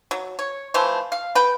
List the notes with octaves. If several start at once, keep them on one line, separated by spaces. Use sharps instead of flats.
F#3
C#5
E3 F3 A3 C5
F5
B4 G5